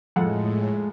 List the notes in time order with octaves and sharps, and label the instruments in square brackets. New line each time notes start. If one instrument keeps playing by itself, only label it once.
[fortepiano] F2 A4 F#5 [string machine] A2 [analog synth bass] G#3